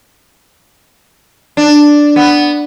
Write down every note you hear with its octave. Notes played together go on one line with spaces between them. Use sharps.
D4
B3